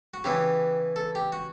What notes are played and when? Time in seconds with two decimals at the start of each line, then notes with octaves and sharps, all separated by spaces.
0.14 F#4
0.24 C#3 E3 B3 E4 G4
0.96 A4
1.15 G4
1.32 F#4